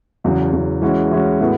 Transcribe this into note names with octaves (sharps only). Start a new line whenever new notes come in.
E2 C#3 F#3
E2 C#3 F#3
E3 G#3 C#4 F#4
E3 G#3 C#4 F#4
A2 G#3 B3 F#4